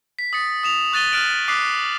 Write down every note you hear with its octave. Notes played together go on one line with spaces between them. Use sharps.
B6
D#6 A6 C#7
D#6 E7 F7
C#6 F#6 A6 D#7 G7
F6 F#6 A6 D7 E7 F#7
D6 D#6 F#6 B6 C7